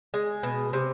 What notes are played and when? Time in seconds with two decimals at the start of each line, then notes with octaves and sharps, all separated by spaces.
0.14 G#3
0.43 B2
0.73 C3